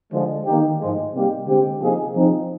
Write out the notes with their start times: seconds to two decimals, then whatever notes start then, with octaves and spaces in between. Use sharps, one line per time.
0.12 D3 F3 G#3
0.46 D#3 A#3 D#4 G4
0.80 G#2 F3 G#3
1.13 C3 G3 A#3 D#4 G4
1.46 D3 G#3 C4 G4
1.80 C3 F3 A#3 D#4 G#4
2.15 F3 C4 D#4